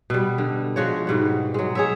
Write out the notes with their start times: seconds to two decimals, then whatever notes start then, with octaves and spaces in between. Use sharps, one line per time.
0.10 B2 G3
0.38 D3
0.76 F3 G#3 F#4 C#5
1.07 G#2 B2 G3
1.54 F#3 G#3
1.75 G#4 C#5 E5